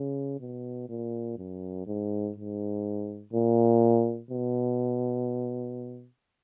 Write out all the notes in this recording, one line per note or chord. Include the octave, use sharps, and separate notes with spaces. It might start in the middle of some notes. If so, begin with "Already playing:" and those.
Already playing: C#3
B2
A#2
F#2
G#2
G#2
A#2
B2